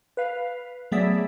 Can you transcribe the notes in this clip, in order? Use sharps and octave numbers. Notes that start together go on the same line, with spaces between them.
B4 F5
F#3 A3 B3 G#4 D5 E5